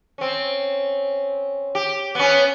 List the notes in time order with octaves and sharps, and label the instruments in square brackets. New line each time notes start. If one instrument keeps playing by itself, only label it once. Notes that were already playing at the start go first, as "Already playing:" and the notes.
[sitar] C4 C#4
G4
B3 C#4